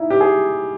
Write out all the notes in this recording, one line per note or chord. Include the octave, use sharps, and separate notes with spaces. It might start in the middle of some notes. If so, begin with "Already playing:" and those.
Already playing: D#4 E4
G4
G#4